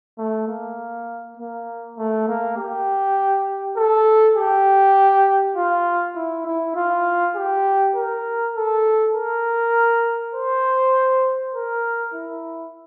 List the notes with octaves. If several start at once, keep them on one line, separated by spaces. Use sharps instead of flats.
A3
A#3
A#3
A3
A#3
G4
A4
G4
F4
E4
E4
F4
G4
A#4
A4
A#4
C5
A#4
E4